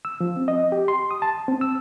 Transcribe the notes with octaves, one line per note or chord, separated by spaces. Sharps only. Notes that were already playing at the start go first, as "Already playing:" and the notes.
E6
F3
C4
D#5
G4
C6
D#6
A5
C4
E6